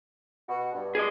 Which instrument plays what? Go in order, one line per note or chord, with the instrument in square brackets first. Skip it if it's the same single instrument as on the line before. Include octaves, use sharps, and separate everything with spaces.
[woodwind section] B2 F#4
G2
[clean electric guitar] G#4 D5 D#5